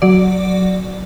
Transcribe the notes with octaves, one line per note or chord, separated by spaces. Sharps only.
F#3 D5